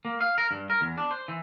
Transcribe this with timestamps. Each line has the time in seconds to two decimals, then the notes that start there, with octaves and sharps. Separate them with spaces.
0.05 A#3
0.21 F5
0.38 A#4
0.51 G2
0.70 A#4
0.81 E2
0.98 D4
1.11 C5
1.28 E3